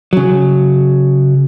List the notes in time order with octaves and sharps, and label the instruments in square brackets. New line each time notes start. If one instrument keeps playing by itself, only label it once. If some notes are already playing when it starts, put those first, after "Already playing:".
[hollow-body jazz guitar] C#3 F#3